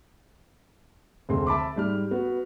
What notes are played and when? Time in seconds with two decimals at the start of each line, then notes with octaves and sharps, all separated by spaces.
1.29 F1 D2 G#3 C4 C6
1.47 E5 A5 B5 D6
1.76 G#2 G3 F6
2.11 B3 F#4